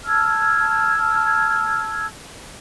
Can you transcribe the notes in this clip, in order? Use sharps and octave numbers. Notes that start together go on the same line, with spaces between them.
A5 E6 F6 G#6